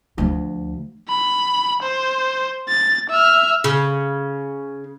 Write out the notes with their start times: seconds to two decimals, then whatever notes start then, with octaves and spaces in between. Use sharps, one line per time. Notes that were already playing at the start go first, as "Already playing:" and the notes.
0.18 D2 F3
1.08 B5
1.83 C5
2.69 A6
3.10 E5 F6
3.64 C#3